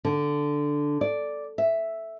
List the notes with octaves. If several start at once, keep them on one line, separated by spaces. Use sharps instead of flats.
D3
D5
E5